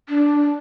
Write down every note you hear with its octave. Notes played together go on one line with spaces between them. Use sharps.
D4